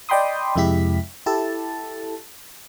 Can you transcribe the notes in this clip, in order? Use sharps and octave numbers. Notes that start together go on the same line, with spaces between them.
D5 D#5 G5 B5 C6 D#6
F2 C3 G#3 E4 G4 B6
E4 G4 A4 A5